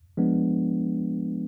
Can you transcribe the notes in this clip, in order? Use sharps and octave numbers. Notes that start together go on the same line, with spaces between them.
F3 G#3 B3 D4